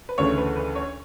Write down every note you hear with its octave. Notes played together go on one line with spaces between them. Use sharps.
B4
D2 C#3 E3 A3 D4 C#5
B4
B4
C#5